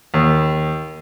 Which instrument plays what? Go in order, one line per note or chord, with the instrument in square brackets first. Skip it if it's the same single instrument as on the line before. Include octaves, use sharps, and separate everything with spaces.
[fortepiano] D#2